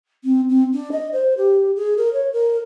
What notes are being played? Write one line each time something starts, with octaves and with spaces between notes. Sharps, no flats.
C4
C4
D4
D#5
C5
G4
G#4
A#4
C#5
A#4